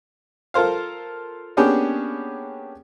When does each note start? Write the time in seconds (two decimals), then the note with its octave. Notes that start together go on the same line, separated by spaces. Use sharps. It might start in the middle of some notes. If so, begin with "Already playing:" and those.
0.54 F4 A4 A#4 C5 F5
1.57 A#3 B3 C#4 D4 G4 G#4